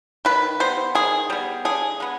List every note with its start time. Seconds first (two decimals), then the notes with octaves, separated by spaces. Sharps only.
0.25 D#3 B4
0.60 G3 B3 C5
0.95 D#3 G#4
1.30 G3 B3
1.65 D3 G#4
2.00 G#3 B3